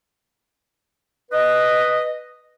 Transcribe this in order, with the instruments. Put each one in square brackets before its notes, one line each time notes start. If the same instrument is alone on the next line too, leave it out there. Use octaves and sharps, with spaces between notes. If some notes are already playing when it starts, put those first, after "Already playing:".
[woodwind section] B4 D#5